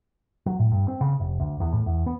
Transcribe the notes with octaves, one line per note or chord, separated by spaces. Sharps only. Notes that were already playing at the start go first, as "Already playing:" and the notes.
F#3
A2
G2
C4
C#3
F1
D2
E2
A2
E2
B3